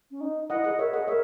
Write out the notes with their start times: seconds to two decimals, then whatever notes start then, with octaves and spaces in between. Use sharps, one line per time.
0.11 C#4
0.21 D#4
0.50 E4 D#5 F#5
0.64 G#4 D#5 F#5
0.79 A#4 C#5 E5
0.93 G#4 D#5 F#5
1.07 A#4 C#5 E5